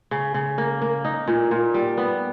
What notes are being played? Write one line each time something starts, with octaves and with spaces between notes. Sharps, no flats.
C#3
C#3
A#3
A#3
D#4
A#2
A#2
G3
B3